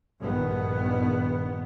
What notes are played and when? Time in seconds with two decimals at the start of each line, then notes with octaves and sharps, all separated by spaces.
0.19 A#1 G2 D#3 B3